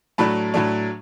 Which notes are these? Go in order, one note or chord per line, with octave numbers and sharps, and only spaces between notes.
A2 F#3 A3 D4 A5 B5
A2 F#3 A3 D4